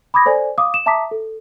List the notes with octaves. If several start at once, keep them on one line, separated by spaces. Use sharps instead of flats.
B5 D6 D#6 G#6 A#6
A4 C5 D5 G#5
F5 D6 D#6
E7
E5 A5 A#5 D6 D#6 B6
A4